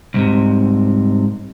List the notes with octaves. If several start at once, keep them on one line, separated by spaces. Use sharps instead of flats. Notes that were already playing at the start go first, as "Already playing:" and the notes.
C2 G#2 C3